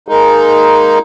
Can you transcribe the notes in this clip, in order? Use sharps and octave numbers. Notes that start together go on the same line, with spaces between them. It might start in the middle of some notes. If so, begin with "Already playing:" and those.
G#3 A#3 D#4